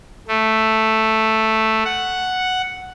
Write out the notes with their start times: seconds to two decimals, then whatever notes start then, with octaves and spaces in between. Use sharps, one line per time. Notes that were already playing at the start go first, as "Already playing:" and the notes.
0.28 A3
1.85 F#5